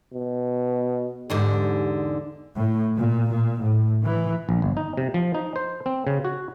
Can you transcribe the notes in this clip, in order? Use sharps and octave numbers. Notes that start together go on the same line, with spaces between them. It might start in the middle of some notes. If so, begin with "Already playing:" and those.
B2
E2 G#2 D3 G4
A2
A#2
A#2
A2
E3
A#1
G1
D#4
C3
F3
D#4
C5
C4
C#3
F#4